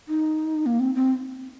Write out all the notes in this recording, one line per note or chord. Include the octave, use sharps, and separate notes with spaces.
D#4
A#3
C4
C4